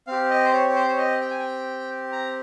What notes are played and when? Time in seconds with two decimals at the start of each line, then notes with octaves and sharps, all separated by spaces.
0.07 C4 G4 F5
0.30 D#5
0.45 C5
0.53 C#5
0.70 C#5
0.76 C5
0.89 C#5
0.98 D#5
1.21 G5
1.30 G#5
1.39 G5
2.12 A#5